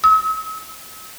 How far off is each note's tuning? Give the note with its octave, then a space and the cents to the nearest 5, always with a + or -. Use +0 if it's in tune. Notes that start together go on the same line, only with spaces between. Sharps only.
E6 -40